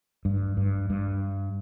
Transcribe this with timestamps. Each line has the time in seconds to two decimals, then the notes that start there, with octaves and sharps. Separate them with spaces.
0.25 G2
0.57 G2
0.90 G2